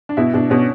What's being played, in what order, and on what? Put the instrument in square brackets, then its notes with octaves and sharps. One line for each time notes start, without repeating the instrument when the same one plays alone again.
[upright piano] D4
[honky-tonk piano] B2 [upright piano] E4
[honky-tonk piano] B2 [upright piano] D4
[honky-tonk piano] B2 [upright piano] C#4